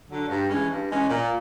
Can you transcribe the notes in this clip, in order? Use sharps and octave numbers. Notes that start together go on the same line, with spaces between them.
D3 F#3
G2
E3 G#3 C#4
G2
E3 G#3 C#4
A#2